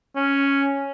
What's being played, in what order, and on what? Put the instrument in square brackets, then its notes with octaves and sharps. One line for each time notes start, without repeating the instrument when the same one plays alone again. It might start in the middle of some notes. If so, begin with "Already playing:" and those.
[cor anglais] C#4